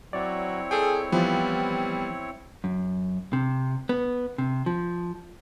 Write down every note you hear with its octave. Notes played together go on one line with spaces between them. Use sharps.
F#3 C4 E4 C#5 D5
G#4 A4 G5
E3 F3 G3 B3
F#2
C3
B3
C3
F3